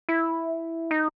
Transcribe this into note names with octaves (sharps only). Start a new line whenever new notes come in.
E4
D#4